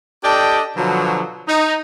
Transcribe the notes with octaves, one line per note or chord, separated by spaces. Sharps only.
D4 G4 A4 D5 D#5 G5
B2 D3 F3 F#3
D#4